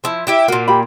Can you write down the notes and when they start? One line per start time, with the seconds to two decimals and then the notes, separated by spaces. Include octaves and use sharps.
0.04 F3 E4
0.27 E4 G4 E5
0.48 A#2 A#3 F#4
0.68 G4 B5